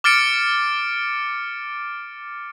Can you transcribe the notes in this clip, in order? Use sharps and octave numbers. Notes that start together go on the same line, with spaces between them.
D6 F6 A6 C#7 D7